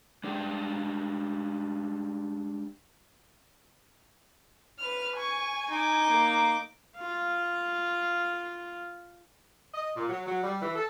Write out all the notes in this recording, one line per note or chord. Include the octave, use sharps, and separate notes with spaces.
G#3 D4 G4 G5
B4 F6
G#5 C#6
D#4 D6
A#3
F4 F5
D#5
A#2
F#3
F#3
G3
E3
A4